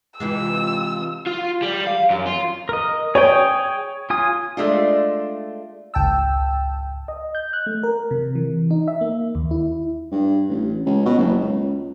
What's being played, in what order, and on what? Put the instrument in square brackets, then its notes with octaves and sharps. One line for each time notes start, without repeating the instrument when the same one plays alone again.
[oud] C3 E3 G#3 [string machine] F4 [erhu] E6
[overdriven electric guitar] F4
G3
F5
F#2
F4
[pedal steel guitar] A#4 D#5
[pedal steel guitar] G#4 G5 [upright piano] C#5
[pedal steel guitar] F4 G#5 D#6
[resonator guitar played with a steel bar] G#3 A3 D4 F4
[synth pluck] G#1 C#2 G5 A5 E6
[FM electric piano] D#5
G6
F#6
A3
A#4
C3
E3
D#4
E5
A#3
D#2
E4
[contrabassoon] G2
A1
C#2
B2
F#1
C#2